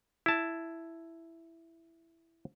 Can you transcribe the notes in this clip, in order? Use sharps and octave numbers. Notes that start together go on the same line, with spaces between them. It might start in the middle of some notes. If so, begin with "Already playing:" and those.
E4 A5